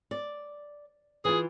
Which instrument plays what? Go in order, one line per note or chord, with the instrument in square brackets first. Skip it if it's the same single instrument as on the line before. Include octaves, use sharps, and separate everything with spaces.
[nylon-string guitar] D5
[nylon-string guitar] E3 F4 [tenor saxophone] G#4